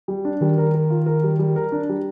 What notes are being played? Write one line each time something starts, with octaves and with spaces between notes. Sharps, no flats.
G3
D4
D#3 G3
A#4
A#4
F4
A#4
G3
G3
A#4
D4
G3